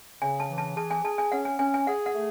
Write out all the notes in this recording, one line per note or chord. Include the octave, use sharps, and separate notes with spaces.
C#3 G#5
A5
E3
A5
G#4 A5
G#5
G#4 A5
G#5
C#4 F#5
G#5
C#4 G#5
G#5
G#4 F#5
F#5
A3